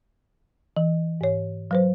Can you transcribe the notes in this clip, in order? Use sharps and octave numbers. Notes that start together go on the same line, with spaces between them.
E3
G#2 C#5
F#3 B4 C5